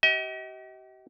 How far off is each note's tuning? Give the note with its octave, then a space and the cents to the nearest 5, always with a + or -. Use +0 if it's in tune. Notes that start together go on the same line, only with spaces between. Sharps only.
G4 -40 D#5 +40